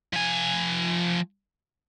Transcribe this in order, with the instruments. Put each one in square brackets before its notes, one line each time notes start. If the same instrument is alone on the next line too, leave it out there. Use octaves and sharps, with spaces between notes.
[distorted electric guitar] F3 G#5